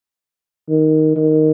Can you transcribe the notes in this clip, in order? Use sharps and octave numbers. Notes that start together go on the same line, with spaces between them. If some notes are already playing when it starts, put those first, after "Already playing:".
D#3
D#3